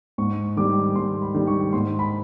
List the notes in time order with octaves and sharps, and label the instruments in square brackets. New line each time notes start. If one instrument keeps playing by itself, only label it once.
[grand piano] G#2 C#6
D#3 G3 D6
G#2 C6
B5
D#3 G3
C#6
G#2 C6
B5